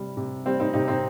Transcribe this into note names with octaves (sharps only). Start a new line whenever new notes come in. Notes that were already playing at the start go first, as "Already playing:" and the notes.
Already playing: C3 G3
C3
G3 C4
C4 D#4
C3 D#4 G4
C4 D#4